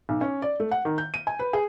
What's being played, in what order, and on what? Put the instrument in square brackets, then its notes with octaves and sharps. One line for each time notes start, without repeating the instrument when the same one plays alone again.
[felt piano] B1
C#4
D5
A3
F#5
D#3
G6
D#7
G#5
B4
G#4